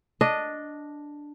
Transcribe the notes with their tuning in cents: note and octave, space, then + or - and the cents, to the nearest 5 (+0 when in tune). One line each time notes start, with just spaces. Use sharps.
D4 +0 D#5 -5